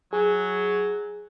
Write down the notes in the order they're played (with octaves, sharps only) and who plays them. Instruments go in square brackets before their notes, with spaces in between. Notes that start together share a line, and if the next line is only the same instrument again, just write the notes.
[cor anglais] F#3 [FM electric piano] G#4